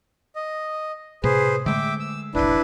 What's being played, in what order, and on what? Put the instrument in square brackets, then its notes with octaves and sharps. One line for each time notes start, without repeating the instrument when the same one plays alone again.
[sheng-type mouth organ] D#5
[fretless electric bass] A2 C3 [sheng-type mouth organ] G#4 B4 C5
[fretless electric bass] D3 G#3 A3 [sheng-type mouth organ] E5 G5 D6
[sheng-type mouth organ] E6
[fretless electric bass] E1 A1 [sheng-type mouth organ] D4 E4 B4